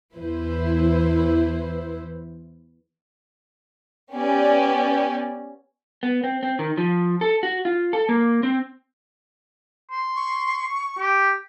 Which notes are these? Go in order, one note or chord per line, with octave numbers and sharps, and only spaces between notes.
E2 E3 E4 B4 C5
B3 C#4 G4 D5
B3
C4
C4
D#3
F3
A4
F#4
F4
A4
A#3
C4
C6
C#6
G4